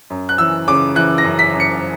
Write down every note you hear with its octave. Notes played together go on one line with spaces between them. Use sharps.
F#2
F#6
E3 E6
C#3 D6
E3 F#6
A#6
F#2
B6
F#2
C#7